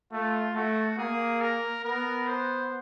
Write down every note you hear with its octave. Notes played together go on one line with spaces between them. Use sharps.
A3 F4
A3 F#4
A#3 G#4
A#4
B3 A#4
C5